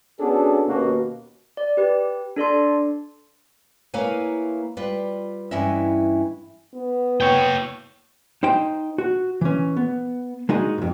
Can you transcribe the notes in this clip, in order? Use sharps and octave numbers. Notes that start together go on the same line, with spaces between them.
B3 C#4 D4 F#4 G#4 A4
D#2 B2 A#3 C#4 F#4
D5
G4 B4
D4 A4 D5 C6
A#3 E4 B4 C#5 F5 G#5
G3 F4 B4
G2 E3 C#4 E4 D#5 E5
B3
C#5 G5
D#4 C5 G5
F#4
E3 C#4
B3
G#3 D#4 F#4 D#5
F2 G#2